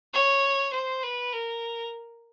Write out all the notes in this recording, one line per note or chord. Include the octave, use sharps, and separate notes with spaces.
C#5
C5
B4
A#4